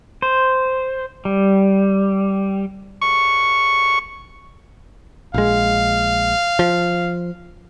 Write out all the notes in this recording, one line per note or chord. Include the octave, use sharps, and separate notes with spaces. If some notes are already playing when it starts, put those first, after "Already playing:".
C5
G3
C#6
A#1 G#3 F5
F3